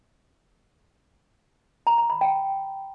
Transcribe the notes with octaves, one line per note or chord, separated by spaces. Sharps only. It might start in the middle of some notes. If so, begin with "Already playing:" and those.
A#5
A#5
B5
G5